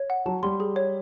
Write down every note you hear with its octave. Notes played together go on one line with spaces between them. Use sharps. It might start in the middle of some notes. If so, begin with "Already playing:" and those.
Already playing: C#5
F#5
F#3 A5
G3 C6
G#4
C#5